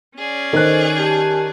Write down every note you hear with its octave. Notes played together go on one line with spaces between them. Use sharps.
C#4 G#4 D5
D#3 A4 C5 D#5 F#6
G4 G#5 A5